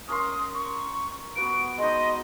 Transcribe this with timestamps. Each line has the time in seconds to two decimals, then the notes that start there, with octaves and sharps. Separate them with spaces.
0.08 C#4 A#4 C6 D#6
0.54 C#6
1.36 B3 F#4 B4 D7
1.78 G#3 D#4 D#5